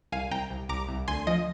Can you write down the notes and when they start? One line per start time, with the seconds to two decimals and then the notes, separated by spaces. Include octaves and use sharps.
0.12 C2 F5 G#5
0.31 C2 G5 A#5
0.50 C2
0.69 C2 A#5 D6
0.89 C2
1.08 D2 G#5 C6
1.27 F3 D#5